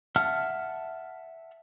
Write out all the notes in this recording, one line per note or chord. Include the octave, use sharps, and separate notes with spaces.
E5 F#5 A5 F6